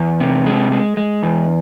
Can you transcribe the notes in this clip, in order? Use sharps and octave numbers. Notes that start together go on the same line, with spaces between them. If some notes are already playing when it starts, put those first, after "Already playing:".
Already playing: E2
C3
G#3
G#3
G#3
E2